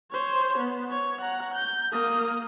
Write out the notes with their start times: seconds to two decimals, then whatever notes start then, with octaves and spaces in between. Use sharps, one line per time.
0.11 C5 C#5
0.58 B3
0.91 C#5
1.21 F#5 A#5
1.54 G6
1.92 A#3 D#6